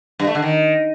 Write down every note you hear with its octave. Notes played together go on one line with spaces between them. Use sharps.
G2
A3
D3
D#3